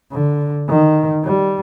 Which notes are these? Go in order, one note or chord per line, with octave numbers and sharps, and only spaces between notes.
D3
D#3
G3